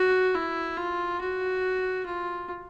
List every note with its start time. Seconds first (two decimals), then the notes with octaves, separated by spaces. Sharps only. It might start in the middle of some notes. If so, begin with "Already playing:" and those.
Already playing: F#4
0.35 E4
0.77 F4
1.20 F#4
2.05 F4